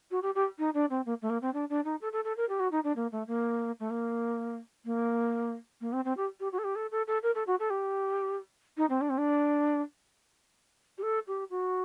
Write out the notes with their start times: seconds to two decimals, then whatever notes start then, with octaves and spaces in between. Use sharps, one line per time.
0.11 F#4
0.22 G4
0.35 G4
0.58 D#4
0.74 D4
0.90 C4
1.05 A#3
1.22 A3
1.29 A#3
1.42 C4
1.53 D4
1.69 D4
1.84 D#4
2.01 A4
2.12 A4
2.24 A4
2.37 A#4
2.48 G4
2.59 F#4
2.71 D#4
2.84 D4
2.96 A#3
3.12 A3
3.27 A#3
3.79 A3
3.90 A#3
4.85 A#3
5.80 A#3
5.92 C4
6.04 C4
6.17 G4
6.40 G4
6.52 F#4
6.58 A4
6.64 G4
6.75 A4
6.91 A4
7.07 A4
7.23 A#4
7.35 A4
7.47 F#4
7.59 A4
7.70 G4
8.77 D#4
8.89 C4
9.01 D4
9.09 C4
9.18 D4
10.97 G4
11.02 A4
11.27 G4
11.50 F#4